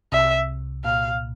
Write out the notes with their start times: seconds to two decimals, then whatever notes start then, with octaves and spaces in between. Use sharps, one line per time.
0.12 C2 C3 E5
0.85 A#2 F5